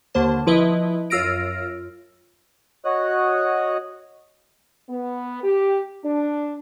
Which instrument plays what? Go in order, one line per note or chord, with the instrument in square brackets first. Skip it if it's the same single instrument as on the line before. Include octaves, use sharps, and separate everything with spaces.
[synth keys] D#2 D3 A#3 C5 A5
F3 E4 B4 D#5 E5
F#2 F4 E6 F6 A#6 D7
[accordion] F#4 C#5 D#5 D#6 F#6
[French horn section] B3
G4
D4